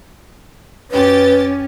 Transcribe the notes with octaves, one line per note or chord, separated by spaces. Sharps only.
F#2 C#4 G4 B4 A6